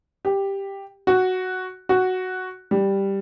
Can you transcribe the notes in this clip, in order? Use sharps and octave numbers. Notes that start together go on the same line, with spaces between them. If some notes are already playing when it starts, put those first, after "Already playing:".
G4
F#4
F#4
G3